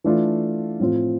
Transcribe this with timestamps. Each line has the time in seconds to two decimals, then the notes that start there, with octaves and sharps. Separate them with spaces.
0.04 E3 A3 D4 F4
0.80 A2 F3 C4 F4